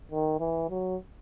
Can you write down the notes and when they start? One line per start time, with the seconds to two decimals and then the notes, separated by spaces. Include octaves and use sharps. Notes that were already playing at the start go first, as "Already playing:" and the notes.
0.11 D#3
0.40 E3
0.70 F#3